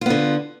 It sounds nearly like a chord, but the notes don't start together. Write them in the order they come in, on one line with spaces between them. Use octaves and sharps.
F4 B3 D3